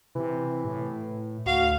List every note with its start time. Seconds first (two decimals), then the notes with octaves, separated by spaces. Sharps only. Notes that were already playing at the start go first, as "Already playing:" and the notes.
0.15 C3 E3
0.65 A2
1.46 D2 F#4 F5